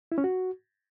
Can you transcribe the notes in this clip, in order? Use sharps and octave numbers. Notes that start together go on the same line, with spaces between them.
E4
C#4
F#4